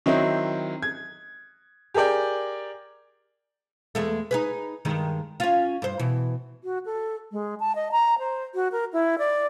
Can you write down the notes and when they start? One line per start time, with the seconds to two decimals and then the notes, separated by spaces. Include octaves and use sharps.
0.06 D#3 F#3 C4 D#4 E4
0.82 G#6
1.94 G4 G#4 A#4 D5 G5
3.95 E2 G#3 A3
4.31 D#4 G#4 B4
4.85 G2 D#3 G#3
5.40 C#4 F4
5.82 G2 C5
5.99 B2 E3
6.64 F#4
6.85 A4
7.32 G#3
7.60 A5
7.75 D#5
7.92 A#5
8.19 C5
8.54 F#4
8.72 A#4
8.93 E4
9.18 D5